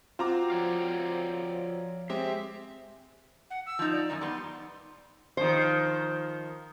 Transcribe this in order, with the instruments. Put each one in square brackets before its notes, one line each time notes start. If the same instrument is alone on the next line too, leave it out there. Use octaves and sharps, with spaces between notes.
[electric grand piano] C4 A#5 D6 [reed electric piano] F4 F#4 F#5
[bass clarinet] F3 [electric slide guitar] C#5 D5 F5
[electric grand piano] G#3 C4 G4 [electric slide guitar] E5
[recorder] F#5
E6
[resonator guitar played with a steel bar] F3 D#4
[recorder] D5
[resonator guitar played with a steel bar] F#2 D#3 D#4
[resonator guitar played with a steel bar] G3 B3 [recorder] C6
[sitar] D#3 F3 [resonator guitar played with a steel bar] C5